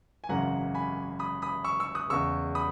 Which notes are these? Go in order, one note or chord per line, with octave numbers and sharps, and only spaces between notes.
G#5
G#1 F#2 C#3 E3 F#5 A#5
G#5 B5
B5 D#6
B5 D#6
C#6 E6
C#6 E6
D#6 F#6
E2 C#3 G#3 C#6 E6
B5 D#6